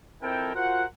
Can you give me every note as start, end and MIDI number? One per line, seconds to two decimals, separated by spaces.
0.23 0.53 41
0.23 0.53 60
0.23 0.53 64
0.23 0.53 69
0.23 0.53 70
0.23 0.53 79
0.55 0.84 65
0.55 0.84 66
0.55 0.84 70
0.55 0.84 72
0.55 0.84 78